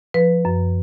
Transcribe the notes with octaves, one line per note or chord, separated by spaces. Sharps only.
F3 B4
F#2